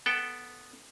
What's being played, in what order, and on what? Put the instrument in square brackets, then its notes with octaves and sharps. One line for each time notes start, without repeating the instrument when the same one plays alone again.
[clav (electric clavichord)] B3 A4 F#5 G5